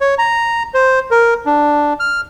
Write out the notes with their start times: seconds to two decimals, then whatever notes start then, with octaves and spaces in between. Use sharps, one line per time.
0.01 C#5
0.18 A#5
0.74 C5
1.11 A#4
1.46 D4
2.00 F6